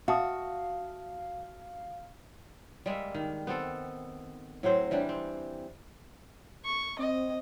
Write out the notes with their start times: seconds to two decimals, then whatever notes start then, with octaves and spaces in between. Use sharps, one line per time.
0.08 F#4 E5 F5 A5 D#6
2.86 G3 G#3 A#3 E5
3.14 D#3
3.47 B3 C4 A4
4.63 A2 F#3 C4 C5
4.91 E3 G3 D4 G4
5.09 C4
6.64 C#6
6.99 C4 D#5